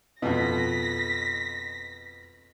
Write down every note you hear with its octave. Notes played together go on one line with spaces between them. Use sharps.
F2 B2 A#6 B6